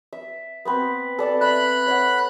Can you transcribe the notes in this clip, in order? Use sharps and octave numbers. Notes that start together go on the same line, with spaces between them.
E5
B3 C4 B4
A4 D5 A5
E5 B5 D#6 F#6
C#5 E5 F#5